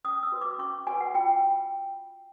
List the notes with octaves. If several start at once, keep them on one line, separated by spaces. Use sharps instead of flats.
C#4 D#6
E6
F#4 B4
D6
C#4 C#6
F#4 B4 G#5
F#5
F4 G5